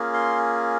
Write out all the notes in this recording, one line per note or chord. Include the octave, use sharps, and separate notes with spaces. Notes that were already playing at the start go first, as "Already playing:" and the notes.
Already playing: A#3 C#4 F4 G#4
C6